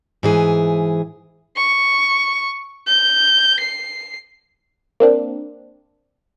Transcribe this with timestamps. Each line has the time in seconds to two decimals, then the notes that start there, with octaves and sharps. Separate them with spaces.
0.23 G#2 E3 G#4
1.57 C#6
2.87 G6
3.60 C7
5.00 A#3 C4 D4